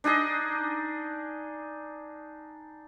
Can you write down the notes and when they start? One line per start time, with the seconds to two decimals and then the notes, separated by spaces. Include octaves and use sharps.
0.04 D4 D#4 G#4 D#5